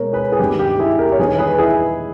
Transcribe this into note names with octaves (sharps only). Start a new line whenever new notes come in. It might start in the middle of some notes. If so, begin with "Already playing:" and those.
Already playing: B2 G#3 A#4 C#5
G#4 B4
G#4
G2 D#3 G3 G4
G4
E4 G#4
G4 A#4
C#5
E2 D#3 G3 G#4 B4
G#4 B4
E4 G#4